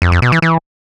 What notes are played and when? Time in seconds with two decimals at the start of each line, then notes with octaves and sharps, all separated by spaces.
0.02 F2
0.12 F2
0.22 B2
0.32 E3
0.42 E3